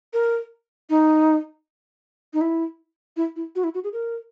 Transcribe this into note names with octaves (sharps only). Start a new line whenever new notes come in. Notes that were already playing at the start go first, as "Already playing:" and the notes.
A#4
D#4
D#4
E4
E4
E4
F#4
E4
F#4
G#4
A#4